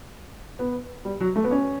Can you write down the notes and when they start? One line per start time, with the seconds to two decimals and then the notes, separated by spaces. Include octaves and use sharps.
0.59 B3
1.05 G3
1.20 F#3
1.36 A3
1.44 B3
1.51 C#4